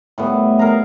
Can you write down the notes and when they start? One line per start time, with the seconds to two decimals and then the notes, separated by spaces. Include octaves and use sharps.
0.18 A2 G3 B3
0.59 G#4 A#4 F5 A#5